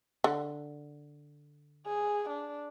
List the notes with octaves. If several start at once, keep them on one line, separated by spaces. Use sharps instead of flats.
D3
G#4
D4